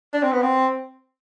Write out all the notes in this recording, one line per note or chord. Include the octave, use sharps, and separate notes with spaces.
D4
C4
B3
C4